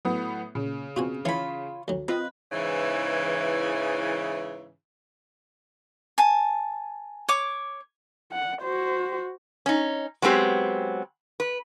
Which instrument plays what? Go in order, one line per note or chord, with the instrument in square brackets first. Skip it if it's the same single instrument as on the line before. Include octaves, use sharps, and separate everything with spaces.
[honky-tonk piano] A2 B3 D#6 [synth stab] F#3
[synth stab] A#2 [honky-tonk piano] C#3
[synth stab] B2 C4 [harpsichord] F4 F#4 G#5
[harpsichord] E3 [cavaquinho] F4 B5 [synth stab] C#5
[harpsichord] D2 F#3
[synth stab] C4 F4 D#5 [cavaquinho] B4
[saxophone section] G#2 C#3 E3
[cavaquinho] G#5 A5
C#5 D6
[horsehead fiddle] F#5
F#4 C5
[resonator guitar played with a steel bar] C#4 D#4
F#3 G#3 B3 C4 G4
B4